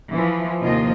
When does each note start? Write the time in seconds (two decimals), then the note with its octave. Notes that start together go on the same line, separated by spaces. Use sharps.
0.12 E3 F3
0.61 D#2 C3 F3 A#3 F4 D#5